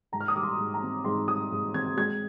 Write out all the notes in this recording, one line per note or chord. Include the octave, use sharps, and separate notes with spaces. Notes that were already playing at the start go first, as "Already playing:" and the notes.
G#2 A#5
F6
D#6
G3 D6
C6
G#2
A#5
C4
G#2 C6
G3 D#6
G#2
C4 G#6
G#3 G#6